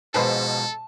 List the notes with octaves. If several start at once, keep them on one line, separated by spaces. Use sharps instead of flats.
G#2 B2 F3 G#4 A4 B4 C5 A5